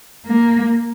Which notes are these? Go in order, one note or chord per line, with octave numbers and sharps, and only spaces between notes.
A#3